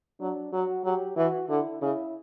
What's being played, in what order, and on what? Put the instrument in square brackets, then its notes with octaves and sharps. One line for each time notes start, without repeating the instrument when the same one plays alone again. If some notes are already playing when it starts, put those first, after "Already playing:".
[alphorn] F#3 [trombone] D4
[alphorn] F#3 [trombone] F#4
[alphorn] F#3 [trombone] G4
[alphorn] E3 [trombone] F#4
[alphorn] D3 [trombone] E4
[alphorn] C#3 [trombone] E4